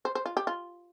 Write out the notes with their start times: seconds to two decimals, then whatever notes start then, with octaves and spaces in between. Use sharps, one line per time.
0.05 C5
0.15 C5
0.26 F4
0.37 G4
0.47 F4